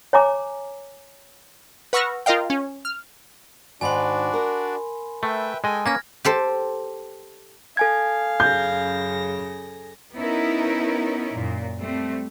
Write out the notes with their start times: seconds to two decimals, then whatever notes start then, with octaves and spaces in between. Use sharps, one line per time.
0.13 C#5 G#5 A#5 D6
1.93 B4 F#5 C#6 E6 F6 A#6
2.26 F4 A#4 D#5 F5 G5
2.50 C#4
2.85 F6
3.81 G#2 D#3 D4 F#4 D5 G#5 B5 C6
4.34 A#4
5.23 A3 B4 E5 G5
5.64 G#3 A4 D#5 G5 G#5
5.86 A#3 C#4 B4 F6 G#6 A#6
6.25 G4 A4 C5
7.77 A4 F5 G#5 G#6
8.40 F#2 C#3 G6 A#6
10.15 B3 C#4 D#4 E4 A#4
11.35 F#2 A#2
11.80 G3 A3 C4